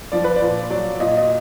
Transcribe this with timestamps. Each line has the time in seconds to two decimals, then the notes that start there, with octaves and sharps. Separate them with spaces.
0.12 F3 D5
0.24 B4
0.36 D5
0.42 A#2
0.70 F#3 D5
1.00 A#2 D#5
1.17 D#5